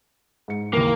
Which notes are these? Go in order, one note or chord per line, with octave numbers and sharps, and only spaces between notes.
G#2 C#7
D#2 E3 A#3